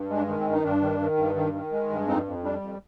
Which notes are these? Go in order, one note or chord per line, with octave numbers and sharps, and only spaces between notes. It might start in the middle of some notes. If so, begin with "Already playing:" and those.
Already playing: G2
G#3
D4
D#3
C4
G2
D#4
G2 D4
D#3
D#3
G2
D#3
D#3
G#3
G2
F2 C4 D#4
F2
G3 D4
F2